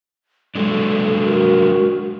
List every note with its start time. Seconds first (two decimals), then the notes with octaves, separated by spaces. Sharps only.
0.55 F#3 G#3 D4 A4
1.24 F#4 A#4